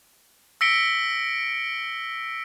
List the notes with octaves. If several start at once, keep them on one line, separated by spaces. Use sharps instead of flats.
E6 A#6 B6 C#7 D7 G7